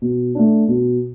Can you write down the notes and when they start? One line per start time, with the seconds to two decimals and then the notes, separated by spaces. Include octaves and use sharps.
0.02 B2
0.35 A3 D4
0.68 B2